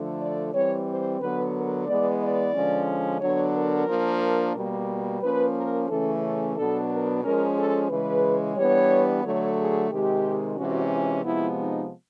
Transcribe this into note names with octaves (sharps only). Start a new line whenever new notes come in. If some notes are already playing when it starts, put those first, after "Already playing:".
Already playing: D3 F3 A3
D5
E3 G3 C4 C#5
C5
D3 F#3 B3 B4
A#4
E3 G#3 B3 D5
D5
D3 F3 G#3 C#4
D3 F#3 B3 D4 C#5
A#4
F3 A#3 D4
B2 G3 A#3
F3 A#3 C#4 B4
A#4
C#3 E3 A3 C#4 A4
A4
B2 F#3 B3 D4 A4
A#4
F3 G#3 C#4 A#4
A4
C#3 E3 G#3 B4
E3 G3 B3 D4 C#5
D3 F#3 A3 C#5
G#4
C3 D#3 G#3 G4
C3 E3 G#3 C#4 F#4
F4
C3 F3 G#3 B3 E4
D#4